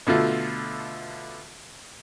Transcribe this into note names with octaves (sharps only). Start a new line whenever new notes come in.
B2 D3 A3 F4